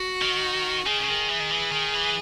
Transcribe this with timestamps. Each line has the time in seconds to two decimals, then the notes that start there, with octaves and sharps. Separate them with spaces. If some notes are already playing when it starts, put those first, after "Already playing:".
Already playing: F#4
0.21 D#3
0.86 D#3 G#4
0.99 C#3
1.08 D#3
1.29 E3
1.40 D#3
1.51 E3
1.72 D#3
1.94 E3